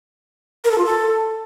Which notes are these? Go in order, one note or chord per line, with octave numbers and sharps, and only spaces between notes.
A#4
A4
F4
A4